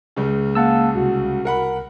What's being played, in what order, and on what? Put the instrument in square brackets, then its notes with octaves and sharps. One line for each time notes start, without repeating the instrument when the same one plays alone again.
[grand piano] C#2 C#3
[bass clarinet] A#3 [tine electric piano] F#5 A5 E6
[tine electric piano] C2 [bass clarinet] F#4
[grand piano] A#4 F#5 B5